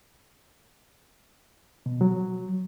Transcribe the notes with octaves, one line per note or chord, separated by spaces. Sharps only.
B2
F#3